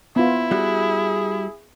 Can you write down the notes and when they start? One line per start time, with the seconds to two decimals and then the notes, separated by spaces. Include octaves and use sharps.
0.16 B3 E4 F4
0.51 G3 F#4 G#4